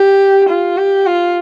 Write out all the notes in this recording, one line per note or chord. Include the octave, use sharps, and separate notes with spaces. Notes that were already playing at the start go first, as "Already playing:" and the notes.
Already playing: G4
F4
G4
F4